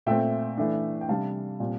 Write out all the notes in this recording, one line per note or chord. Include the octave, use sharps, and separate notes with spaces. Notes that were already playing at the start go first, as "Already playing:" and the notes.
A#2 A3 C4 E5 G5
E3 A3 D4
G5
C3 G3 D4 F5 A5
A#2 G3 C4